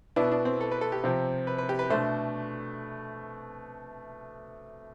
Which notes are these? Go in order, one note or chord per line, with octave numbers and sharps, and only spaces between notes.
B2 B3 D4 E4
D4
C4
A4
B4
A4
G4
C3 F3 C4
B4
B4
G4
B4
B2 A3 D4 C5